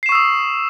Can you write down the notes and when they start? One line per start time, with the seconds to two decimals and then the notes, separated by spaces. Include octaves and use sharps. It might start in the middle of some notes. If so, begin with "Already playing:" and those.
0.03 C7
0.06 E7
0.09 C#6
0.12 E6
0.15 D#6